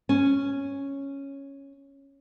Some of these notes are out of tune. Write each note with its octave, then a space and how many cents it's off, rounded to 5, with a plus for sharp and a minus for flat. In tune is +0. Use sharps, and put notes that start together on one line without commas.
C#4 -5